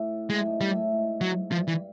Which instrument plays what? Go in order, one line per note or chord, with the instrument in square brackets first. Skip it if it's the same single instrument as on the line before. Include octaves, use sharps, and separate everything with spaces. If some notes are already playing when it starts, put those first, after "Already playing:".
Already playing: [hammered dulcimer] A2
[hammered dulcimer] A2 [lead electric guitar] G#3
[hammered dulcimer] G#2
[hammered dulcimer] A2 [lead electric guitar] G3
[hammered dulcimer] A2
G#2
[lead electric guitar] F#3
[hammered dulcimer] G2 [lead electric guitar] F3
[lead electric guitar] E3